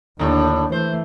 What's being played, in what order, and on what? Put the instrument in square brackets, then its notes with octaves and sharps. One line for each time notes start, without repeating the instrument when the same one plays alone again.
[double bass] D#2 D4 [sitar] A2 D3
[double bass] E3 A3 [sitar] C5